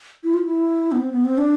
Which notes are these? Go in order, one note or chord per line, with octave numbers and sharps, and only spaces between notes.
E4
F4
E4
B3
C4
B3
C4
D4